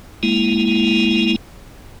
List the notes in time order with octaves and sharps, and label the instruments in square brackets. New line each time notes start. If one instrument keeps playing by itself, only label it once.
[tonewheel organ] G#3 A#3 E4